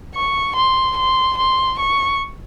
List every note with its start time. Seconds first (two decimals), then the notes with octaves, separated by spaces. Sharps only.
0.15 C#6
0.56 C6
0.97 C6
1.37 C6
1.79 C#6